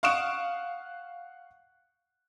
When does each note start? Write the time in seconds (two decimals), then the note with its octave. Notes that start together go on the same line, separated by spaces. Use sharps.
0.03 F5 F#5 C#6 D#6 D7 E7